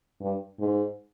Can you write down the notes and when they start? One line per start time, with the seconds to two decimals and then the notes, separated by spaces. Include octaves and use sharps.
0.21 G2
0.60 G#2